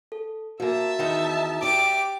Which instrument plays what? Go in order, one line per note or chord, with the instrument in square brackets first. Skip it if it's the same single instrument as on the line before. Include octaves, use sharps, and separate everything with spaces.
[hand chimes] A4
[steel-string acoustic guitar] F3 A#3 [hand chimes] F#4 [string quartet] E5 A5
[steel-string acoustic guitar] E2 D#3 D#4
[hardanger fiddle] G4 D6 [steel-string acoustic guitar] D5